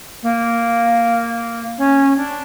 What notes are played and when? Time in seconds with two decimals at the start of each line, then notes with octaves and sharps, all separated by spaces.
0.22 A#3
1.78 C#4
2.17 D4